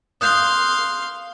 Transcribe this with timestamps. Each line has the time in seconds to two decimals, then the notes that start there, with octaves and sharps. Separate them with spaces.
0.21 F5 C6 D#6 F#6 G6